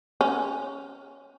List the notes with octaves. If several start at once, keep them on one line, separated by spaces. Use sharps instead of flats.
C#4